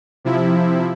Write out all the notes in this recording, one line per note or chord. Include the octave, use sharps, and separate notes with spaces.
C3 F3 E4